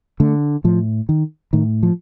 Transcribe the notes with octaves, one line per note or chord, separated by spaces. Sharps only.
D3 A3
A2 F3
D#3
A2 D#3
F3